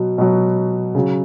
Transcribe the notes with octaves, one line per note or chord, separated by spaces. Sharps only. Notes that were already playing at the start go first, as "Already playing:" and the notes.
Already playing: B2 F#3
B2 F#3
C#3 F#3